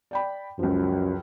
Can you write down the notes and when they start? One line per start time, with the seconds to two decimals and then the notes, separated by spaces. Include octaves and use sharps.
0.11 D5 G5 B5
0.59 C#2 F#2 F3